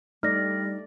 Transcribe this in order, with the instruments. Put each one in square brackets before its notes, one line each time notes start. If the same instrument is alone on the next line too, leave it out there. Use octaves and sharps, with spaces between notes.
[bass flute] G3 [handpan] A3 D5 [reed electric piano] D#4 [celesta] F6 A#6